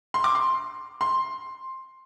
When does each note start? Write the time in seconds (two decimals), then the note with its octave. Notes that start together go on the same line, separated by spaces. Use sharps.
0.14 C6
0.24 D6
0.35 C6
1.01 C6